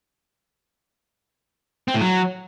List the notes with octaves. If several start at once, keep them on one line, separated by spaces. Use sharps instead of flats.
C4
A2
F#3